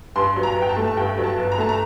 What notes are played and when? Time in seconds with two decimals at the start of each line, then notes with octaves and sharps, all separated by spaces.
0.16 G2 C6
0.36 F#3
0.43 A#5
0.56 G1
0.62 G5
0.69 A5
0.76 A3
0.87 A5
0.97 G2 G5
1.18 F#3
1.24 A5
1.37 G1
1.52 A#5
1.58 A3 A5
1.69 A#5